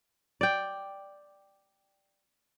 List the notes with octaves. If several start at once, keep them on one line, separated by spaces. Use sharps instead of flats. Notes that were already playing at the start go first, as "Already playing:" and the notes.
D5 G5